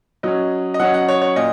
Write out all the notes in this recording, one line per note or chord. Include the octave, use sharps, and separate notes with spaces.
F#3 C#4 D#5
D#5
F#3 C#4 F#5
F#5
C#5
C#5
A#2 D#5